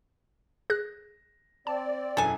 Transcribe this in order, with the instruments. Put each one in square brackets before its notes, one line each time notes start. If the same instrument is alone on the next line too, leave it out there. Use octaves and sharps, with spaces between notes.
[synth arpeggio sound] G#4 F#6 [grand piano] A#6
[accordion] C4 D5 [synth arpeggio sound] A5
[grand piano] E1 F#2 E3 [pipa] A4 G#5